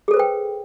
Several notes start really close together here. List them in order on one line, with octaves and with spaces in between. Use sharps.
G#4 A4 C5 B4 G5